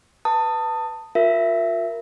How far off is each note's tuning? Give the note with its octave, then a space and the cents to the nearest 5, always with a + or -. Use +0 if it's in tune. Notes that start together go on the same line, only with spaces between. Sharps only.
B4 +0 A5 +25 D#6 +0
F4 +40 A#4 +0 E5 +15